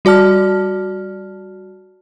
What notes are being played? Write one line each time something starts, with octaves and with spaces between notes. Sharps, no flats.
G3 F#4 D5 A5 F6